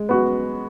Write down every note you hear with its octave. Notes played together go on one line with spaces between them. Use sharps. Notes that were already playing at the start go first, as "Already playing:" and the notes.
Already playing: G#3
B3 F#4